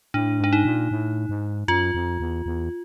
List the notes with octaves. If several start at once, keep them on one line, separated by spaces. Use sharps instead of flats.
A2 D4
G#2 D4
D#4
A#2
A2
G#2
F#2 F4
F2
E2
E2